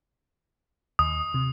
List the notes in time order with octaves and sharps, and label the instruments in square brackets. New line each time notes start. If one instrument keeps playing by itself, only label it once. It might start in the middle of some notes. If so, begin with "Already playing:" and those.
[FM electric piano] D#2 [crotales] D#6
[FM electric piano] C3